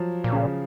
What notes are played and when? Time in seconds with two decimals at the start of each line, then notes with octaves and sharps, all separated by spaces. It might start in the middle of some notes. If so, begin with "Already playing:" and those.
Already playing: F3 F#3
0.24 A#2
0.32 C#3